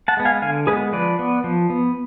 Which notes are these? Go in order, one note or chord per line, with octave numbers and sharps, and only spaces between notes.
F#5 A5
G#3 B3
F5 G#5
D3 F5 G#5
G#3 B3 G#4 B4
F3 B4 D5
B3
F3
B3